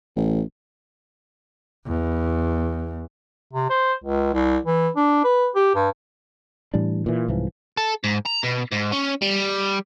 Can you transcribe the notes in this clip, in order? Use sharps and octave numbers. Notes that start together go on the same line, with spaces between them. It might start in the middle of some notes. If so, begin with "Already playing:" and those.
A1
E2
C3
C5
C#2
C2
E3
D4
B4
G4
G2
A2 E3 G3 D4
A#2 E3
C2 G#2 E3 F3
A4
G#2
A#5
B2
G#2
C#4
G3